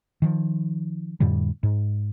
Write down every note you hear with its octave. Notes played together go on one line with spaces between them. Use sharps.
D#3 F3
F2 A2 D3 G3
G#2